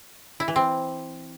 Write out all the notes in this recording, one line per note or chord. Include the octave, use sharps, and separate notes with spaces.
E4
E3
C4